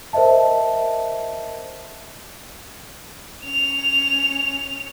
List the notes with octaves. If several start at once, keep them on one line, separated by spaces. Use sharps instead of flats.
A#4 C5 D#5 E5 A5
C#4 F7